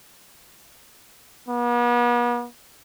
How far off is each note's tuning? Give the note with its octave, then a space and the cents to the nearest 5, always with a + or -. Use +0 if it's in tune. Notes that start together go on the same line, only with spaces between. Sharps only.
B3 -40